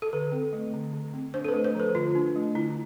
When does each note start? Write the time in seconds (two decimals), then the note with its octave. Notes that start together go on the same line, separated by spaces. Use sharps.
0.02 A4
0.13 D3 B4
0.32 C4
0.53 A3
0.74 D3
0.94 D3
1.14 C4
1.34 D4 C5
1.45 A4
1.48 B4
1.54 A3
1.64 C5
1.75 F3 B4
1.95 D3 F4
2.15 D4
2.36 A3
2.55 D3 E4